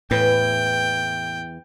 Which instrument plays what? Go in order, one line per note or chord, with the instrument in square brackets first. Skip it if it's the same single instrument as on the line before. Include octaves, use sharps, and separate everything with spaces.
[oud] E2 E3 B4 [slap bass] A2 [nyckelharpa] G5